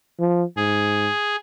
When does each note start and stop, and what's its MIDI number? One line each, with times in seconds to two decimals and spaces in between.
0.20 0.43 53
0.57 1.09 44
0.57 1.36 68